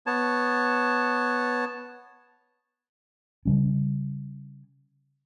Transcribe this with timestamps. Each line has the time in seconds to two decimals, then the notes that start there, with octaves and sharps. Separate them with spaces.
0.07 B3 C#5 A5
3.45 C#3 G3 C#4